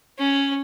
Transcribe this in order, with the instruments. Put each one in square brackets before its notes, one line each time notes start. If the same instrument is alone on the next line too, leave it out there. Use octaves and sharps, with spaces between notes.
[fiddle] C#4